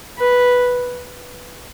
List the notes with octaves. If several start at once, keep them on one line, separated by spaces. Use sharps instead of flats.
B4